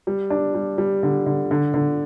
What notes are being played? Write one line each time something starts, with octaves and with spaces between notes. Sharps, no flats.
G3
D4
G3
G3
D3
D3
D3
D3